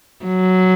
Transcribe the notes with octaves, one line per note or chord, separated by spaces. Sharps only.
F#3